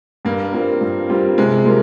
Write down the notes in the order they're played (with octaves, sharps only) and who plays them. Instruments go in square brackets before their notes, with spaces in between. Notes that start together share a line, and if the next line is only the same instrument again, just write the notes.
[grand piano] G2 [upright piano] A#3
[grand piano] G3 C4 F4 A#4
G2
G3 C4 F4 A#4
[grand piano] C3 [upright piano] G#3
[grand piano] G3 A#3 F4 A#4